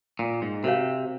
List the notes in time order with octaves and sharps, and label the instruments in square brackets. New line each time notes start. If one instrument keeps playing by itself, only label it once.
[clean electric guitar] A#2
G#2
[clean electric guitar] C3 [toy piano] F#4 A#4 C#5 F5